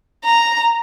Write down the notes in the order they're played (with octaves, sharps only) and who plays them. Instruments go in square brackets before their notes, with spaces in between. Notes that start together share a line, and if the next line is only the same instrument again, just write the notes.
[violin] A#5